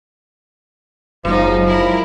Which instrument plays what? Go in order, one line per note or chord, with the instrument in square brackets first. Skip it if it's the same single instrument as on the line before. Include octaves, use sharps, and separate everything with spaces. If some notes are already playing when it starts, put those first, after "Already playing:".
[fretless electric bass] F#1 [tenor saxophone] F3 [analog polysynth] F#3 G#3 [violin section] D#4
[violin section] E4 A#4